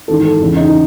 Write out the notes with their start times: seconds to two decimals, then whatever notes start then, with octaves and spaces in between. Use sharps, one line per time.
0.08 G#1 G#2 E3 A4
0.24 A4
0.40 F#1 E2 C#3
0.57 D#4